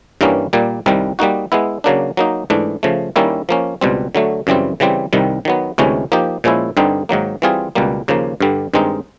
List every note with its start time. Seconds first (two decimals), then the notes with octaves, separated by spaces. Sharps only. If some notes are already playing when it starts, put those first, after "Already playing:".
0.21 G2 E3 G3 A#3 C#4
0.53 A#2 G3 A#3
0.86 C2 C3 D#3 G3
1.19 G3 A#3 D#4 F#4
1.52 G#3 B3 E4
1.84 C#3 F#3 A#3 D4
2.17 F#3 A#3 D#4
2.50 G#2 E3 A3 D4
2.83 C#3 F3 A3
3.16 D#3 G3 A#3 C#4 E4
3.49 F3 A#3 C#4
3.81 C#2 B2 G3 C4
4.15 D3 F#3 A3
4.47 F#2 C#3 E3 G3 C4
4.80 C#3 E3 G3 C4
5.13 C2 C3 D#3 G3
5.45 D#3 F#3 B3
5.78 D2 C3 E3 G#3 C#4
6.12 F3 A#3 D#4 G4
6.44 A#2 F3 G#3 C#4 E4
6.77 G2 D3 G3 C4 D#4
7.09 G#2 D#3 F#3 A#3
7.42 E3 G3 C4 F4 G#4
7.75 C#2 B2 G3 A#3
8.08 D#2 C#3 F3 A#3
8.41 G2 D3 G3
8.74 G2 D#3 G#3 C4 D#4